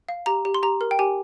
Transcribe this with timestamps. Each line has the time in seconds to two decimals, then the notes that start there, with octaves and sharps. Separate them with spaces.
0.09 F5
0.26 G4 A#5
0.45 G4
0.54 C6
0.63 G4 A#5
0.81 A#4
0.91 G5
0.99 G4 G#5